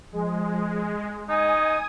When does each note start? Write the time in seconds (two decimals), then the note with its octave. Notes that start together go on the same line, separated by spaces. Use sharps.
0.13 F3 G#3
1.29 D#4 D#5 G#5 D#6